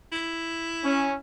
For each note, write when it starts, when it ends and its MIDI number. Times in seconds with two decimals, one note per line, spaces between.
0.12 1.18 64
0.84 1.14 61